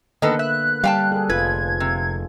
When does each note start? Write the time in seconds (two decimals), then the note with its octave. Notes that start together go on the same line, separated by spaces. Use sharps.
0.22 D3 D#3 A#3 B3 A4 B4 D#5
0.39 E5 F#6
0.84 G3 F5 G5 A5
1.12 G#4 A4
1.30 F1 F4 B4 G#6
1.80 C3